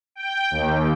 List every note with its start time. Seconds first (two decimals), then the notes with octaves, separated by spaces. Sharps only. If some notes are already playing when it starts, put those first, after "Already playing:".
0.16 G5
0.51 D#2